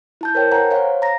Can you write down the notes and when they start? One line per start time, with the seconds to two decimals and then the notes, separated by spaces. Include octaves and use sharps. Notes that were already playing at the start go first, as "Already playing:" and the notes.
0.21 E4 A5 G6
0.35 A#4 C5 C#5 G5
0.51 B4 C#5 F#5 G#5 A#5
0.71 C5 C#5 F5
1.02 A#5 A#6